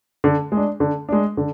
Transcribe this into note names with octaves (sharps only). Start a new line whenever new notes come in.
D3
G#3
D4
D3
G#3 D4
D3